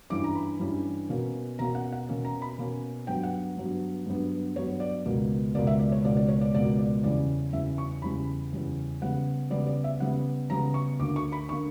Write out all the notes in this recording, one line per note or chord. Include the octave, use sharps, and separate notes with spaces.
G2 E3 G3 C#4 D6
A#5
B5
G2 E3 G3 C#4
B2 A#3 C#4
B2 A#3 C#4 A#5
F#5
F#5
B2 A#3 C#4
A#5
B5
B2 A#3 C#4
G2 F#3 B3 G5
F#5
G2 F#3 B3
G2 F#3 B3
G2 F#3 B3 C#5
D5
C#2 B2 A#3
C#2 B2 A#3 D5
E5
D5
C#5
C#2 B2 A#3 D5
D5
C#5
D5
C#2 B2 A#3 D5
D5
E2 C#3 G3 C#4 D5
E2 C#3 G3 C#4 E5
C#6
E2 C#3 G3 C#4 B5
E2 C#3 G3 C#4
C#3 G3 B3 F#5
C#3 G3 B3 D5
D5
E5
C#3 G3 B3 F#5
C#3 G3 B3 A#5
C#6
D2 D3 A#3 D6
C#6
B5
D3 A#3 C#6